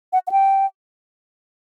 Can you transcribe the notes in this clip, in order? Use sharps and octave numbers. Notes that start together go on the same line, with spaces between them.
F#5
F#5
G5